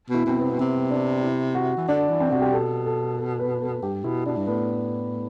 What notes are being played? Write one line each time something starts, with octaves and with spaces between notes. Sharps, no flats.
B2 E4
B2 C4
B3
C3
B2
C3 C4
D4
E4
F#4
E3
D3 D4
E3
C4
C3 F#4
G4
B2 A4
A4
A4
B4
A4
G2 G4
B2 E4
B2 D4
G2
A2 B3